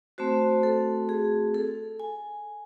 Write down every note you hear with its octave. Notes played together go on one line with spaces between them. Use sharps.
A3 C4 F#4 C5
A4
G#4
A4
G#5